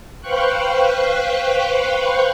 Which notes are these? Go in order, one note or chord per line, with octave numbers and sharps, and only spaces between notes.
B4 C5 F5 G5 C#6 F#6